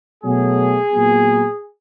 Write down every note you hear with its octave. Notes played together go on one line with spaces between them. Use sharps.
B2 F#3 A3 G#4
A#2 F#3 B3